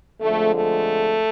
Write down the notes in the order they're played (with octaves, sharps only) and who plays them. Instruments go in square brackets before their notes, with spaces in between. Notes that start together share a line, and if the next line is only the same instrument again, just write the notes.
[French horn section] F2 D3 F3 G#3 A3
A3